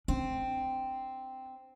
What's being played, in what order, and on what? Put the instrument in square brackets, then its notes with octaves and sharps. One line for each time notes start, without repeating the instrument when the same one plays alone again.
[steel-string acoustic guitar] C4 [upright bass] D4